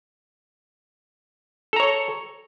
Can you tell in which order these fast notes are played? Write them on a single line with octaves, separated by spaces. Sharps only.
A4 A#5 C#5